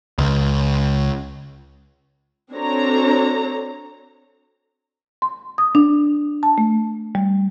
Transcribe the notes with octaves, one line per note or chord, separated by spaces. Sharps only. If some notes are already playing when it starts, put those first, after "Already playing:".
C#2
C4 D4 F#4 A4 C#5 A#5
C6
D#6
D4
A5
A3
G3